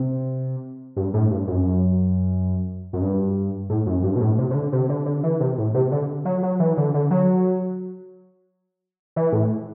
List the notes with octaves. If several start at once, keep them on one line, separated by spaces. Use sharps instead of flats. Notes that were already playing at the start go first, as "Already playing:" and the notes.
Already playing: C3
G2
A2
G2
F#2
F#2
G2
A2
F#2
G2
B2
A2
C3
C3
D3
C3
D3
D3
E3
C3
A2
C3
D3
F#3
F#3
E3
D3
D3
F#3
E3
A2